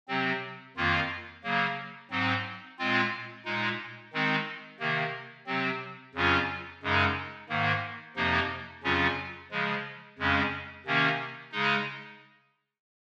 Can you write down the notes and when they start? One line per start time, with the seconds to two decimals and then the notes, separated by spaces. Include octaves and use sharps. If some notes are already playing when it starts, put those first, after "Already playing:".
0.08 C3 F#3 C4
0.76 F2 D#3 A#3 F4
1.43 C#3 F#3 A#3
2.11 G#2 F#3 C4 D#4
2.79 A#2 G#3 C4 F4
3.45 A#2 G#3 D#4
4.13 D#3 G#3 C4 D#4
4.79 C3 D#3 A#3
5.47 C3 F#3 C4
6.14 F2 C#3 F#3 C#4 F4
6.82 F#2 C#3 G#3 D#4
7.49 G#2 D#3 A#3
8.16 F2 C3 F3 A#3 D#4
8.83 F2 C#3 F#3 C#4 F4
9.51 C#3 F3 G#3
10.18 F2 C#3 G#3 C#4
10.86 C3 D#3 A#3 C#4
11.52 C#3 G#3 D#4